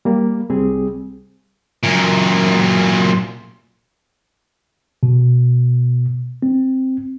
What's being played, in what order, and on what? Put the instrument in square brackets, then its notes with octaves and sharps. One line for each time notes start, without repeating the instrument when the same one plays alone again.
[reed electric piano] G3 A#3
C2 G3 C4 G#4
[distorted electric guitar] F#2 A#2
[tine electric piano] B2
C4